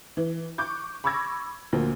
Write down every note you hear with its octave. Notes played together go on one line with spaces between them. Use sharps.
E3
C#6 D6 F#6 G6
B5 C#6 D6 E6 G#6 A#6
D2 A#2 F3 A#3